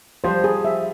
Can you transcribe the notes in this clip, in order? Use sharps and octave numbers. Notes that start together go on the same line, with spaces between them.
F3 G3 C5
G#4
E5